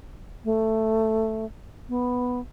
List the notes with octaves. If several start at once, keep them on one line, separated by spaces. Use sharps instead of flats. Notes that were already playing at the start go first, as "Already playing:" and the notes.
A3
B3